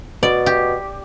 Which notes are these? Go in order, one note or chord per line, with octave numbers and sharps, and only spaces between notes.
B2 D5
G4